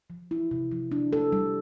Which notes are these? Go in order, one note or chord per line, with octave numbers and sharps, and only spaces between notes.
F3
E4
C3
F3
D4
A4
G3